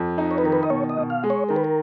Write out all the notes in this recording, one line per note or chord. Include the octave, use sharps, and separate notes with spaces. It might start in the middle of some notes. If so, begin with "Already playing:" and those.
Already playing: F2
D#4
C#5
B4
D#3 A#4
B4
D#5
B2 C#5
D#5
B2
F5
G#3
C#5
D#3 A#4
B4
A#4